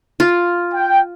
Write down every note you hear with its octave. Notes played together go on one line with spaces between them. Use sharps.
F4
G5